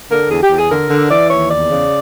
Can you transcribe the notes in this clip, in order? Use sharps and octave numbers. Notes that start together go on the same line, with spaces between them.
D3 A#4
E2 G#4
G4
E2
G#4
D3 A#4
D3
E3 D5
D#2 C#5
E2 D5
C#3